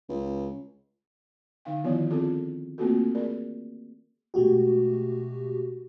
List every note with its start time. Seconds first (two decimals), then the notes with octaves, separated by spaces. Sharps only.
0.08 C#2
1.65 D3 D#4 F5 G5
1.84 D#3 F3 B3 E4 F4 C#5
2.10 C4 F4 G#4 A4 A5
2.78 A3 A#3 C4 F4 F#4 A4
3.15 G#4 A#4 D5
4.34 B2 G#3 A3 F#4 G4